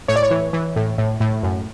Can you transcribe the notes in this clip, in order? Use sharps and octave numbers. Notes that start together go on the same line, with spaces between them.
A2 C#5
D5
C#5
E3
E3
A2
A2
A2
F#2